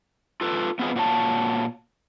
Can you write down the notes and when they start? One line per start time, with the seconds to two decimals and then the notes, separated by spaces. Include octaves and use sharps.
0.41 F4 A4 B4
0.79 B3 C4 F4 G#4 B4 D#5
0.96 A#2 F#4 C#5 A5